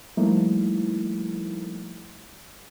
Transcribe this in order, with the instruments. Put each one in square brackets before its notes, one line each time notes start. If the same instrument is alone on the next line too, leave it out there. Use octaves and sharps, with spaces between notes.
[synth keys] F3 G3 A3 A#3 D#4 E4